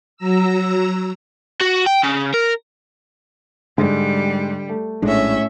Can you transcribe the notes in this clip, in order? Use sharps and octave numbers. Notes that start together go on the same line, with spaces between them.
F#3 A#5 E6
F#4
G5
C#3
A#4
G#2 D3 G3
A3
A#1 A2 G#3 C#4 D4 E5